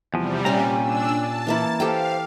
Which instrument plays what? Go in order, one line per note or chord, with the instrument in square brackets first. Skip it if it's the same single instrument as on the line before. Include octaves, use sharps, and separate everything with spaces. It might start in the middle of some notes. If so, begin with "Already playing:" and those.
[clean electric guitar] E2 F3 [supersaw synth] C3 G3 [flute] G4
[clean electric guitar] A#2 A#5 [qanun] A#3 C#4 G4 [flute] G#5
[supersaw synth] D4 E6
A5
[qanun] E3 A#3 E4
[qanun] G4 A4 G5 [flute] C5 [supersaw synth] F5